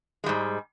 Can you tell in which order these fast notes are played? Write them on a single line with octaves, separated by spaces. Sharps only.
G#3 G3 G#2